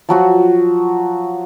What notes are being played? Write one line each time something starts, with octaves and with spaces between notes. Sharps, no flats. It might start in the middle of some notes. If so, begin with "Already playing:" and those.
F3 F#3 F#4